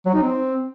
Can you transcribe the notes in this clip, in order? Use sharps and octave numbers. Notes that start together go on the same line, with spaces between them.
F#3
D#4
C4